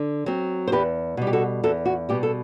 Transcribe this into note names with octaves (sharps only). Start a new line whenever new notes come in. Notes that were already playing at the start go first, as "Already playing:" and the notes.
Already playing: D3
F#3 C4
C5
E2 G4 B4
B2 G3
G4
F#4 A4
E2 F#4 A4
F#4
B2 G3 G4
A4